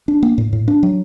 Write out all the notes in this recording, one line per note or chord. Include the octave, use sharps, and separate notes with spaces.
D4
A#3
A2
A2
D4
F#3